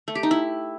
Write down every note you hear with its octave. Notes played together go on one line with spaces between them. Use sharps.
A3
G4
D#4
E4